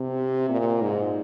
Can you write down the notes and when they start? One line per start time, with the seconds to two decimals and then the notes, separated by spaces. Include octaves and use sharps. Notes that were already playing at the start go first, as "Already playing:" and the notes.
Already playing: C3
0.49 A#2
0.82 G#2